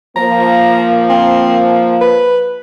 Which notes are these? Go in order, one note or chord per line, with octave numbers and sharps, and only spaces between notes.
F3 A#3 A#5
C4
B4